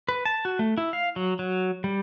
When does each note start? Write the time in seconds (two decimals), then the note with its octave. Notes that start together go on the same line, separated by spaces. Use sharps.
0.09 B4
0.25 A5
0.45 F#4
0.59 A3
0.78 E4
0.93 F5
1.16 F#3
1.39 F#3
1.84 G3